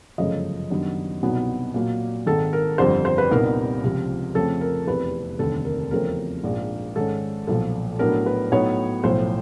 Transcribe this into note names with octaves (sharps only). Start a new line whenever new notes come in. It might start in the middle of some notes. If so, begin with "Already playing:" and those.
G1 F#2 C#3 F3 A3 D#5
F#2 D#3 G3 B3 D4
C2 B2 F#3 B3 D#4
A#2 F#3 A#3
G#1 G#2 D#3 A4
A#4
G1 F2 D3 G3 C5
C5
B4
C2 A#2 G3 B3 D#4 A#4
C#2 C3 F3
F2 C#3 F3 A3 C4 A4
A#4
F1 E2 C3 B4
F1 D#2 D3 G3 A4
A#4
E2 C#3 F3 A3 C4 A#4
A#1 G#2 F3 A#3 D4
G#2 D#3 G#3 C#4 A4
B1 A#2 F3 A4
A2 F#3 B3 D4 A#4
B4
A2 F#3 B3 D#4 C#5
B1 A2 F3 C5